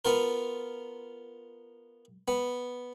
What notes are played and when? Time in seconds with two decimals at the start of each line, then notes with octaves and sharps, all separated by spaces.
0.05 B3 F4 A#4
2.28 B3